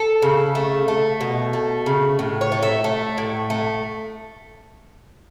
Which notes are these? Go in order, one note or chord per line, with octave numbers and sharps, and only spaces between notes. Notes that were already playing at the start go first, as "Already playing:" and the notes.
Already playing: A4
C#3
A3
A3
B2
A3
C#3
A2
C#5
A3
E5
A3
A2
A3